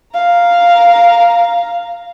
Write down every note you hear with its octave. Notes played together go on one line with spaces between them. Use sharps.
F5 A#5